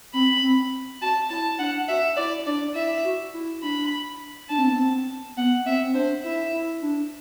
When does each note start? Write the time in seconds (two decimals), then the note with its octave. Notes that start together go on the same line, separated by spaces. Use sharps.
0.14 C4 B5
0.43 C4
1.01 F#4 A5
1.30 E4 A5
1.59 D4 F#5
1.89 F#4 E5
2.17 E4 D5
2.46 D4 D5
2.75 E4 E5
3.04 F#4
3.34 E4
3.63 D4 B5
4.49 D4 A5
4.58 C4
4.68 B3
4.76 C4
5.37 B3 F#5
5.65 C4 E5
5.85 C4
5.95 D4 C5
6.24 E4 E5
6.53 E4
6.82 D4